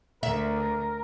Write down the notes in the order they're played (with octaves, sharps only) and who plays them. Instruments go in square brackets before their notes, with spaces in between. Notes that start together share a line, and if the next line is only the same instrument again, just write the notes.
[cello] D2 [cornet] A#4 [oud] E5